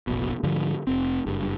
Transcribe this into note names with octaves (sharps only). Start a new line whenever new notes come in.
F1 A#1 B2
G#2 D3 F3 G3
F1 C4
F#1 G2